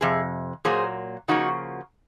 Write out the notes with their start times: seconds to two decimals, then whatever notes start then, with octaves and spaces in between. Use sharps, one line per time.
0.01 F2 C3 G#4
0.65 A#2 F#3 A#3 G#4 C5
1.28 C#3 F3 A#3 D#4 F#4